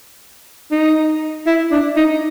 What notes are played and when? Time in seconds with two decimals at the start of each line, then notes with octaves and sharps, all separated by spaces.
0.71 D#4
1.47 E4
1.71 D4
1.96 D#4